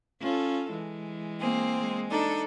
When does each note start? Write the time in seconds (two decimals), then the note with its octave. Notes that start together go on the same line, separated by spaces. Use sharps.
0.20 C#4 F4 A4
0.70 E3 G#3
1.39 A#3 C4 G#4
1.81 G#3
2.10 D4 D#4 A4